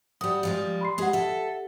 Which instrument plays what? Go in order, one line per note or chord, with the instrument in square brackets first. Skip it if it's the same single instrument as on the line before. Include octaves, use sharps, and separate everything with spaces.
[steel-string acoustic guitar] G3 F#4 [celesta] D#6
[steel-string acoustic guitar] F3 G3 G#3
[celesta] B5 C6 C7
[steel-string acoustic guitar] G#3 G#4 [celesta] G4 F#5
[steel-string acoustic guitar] A4 E5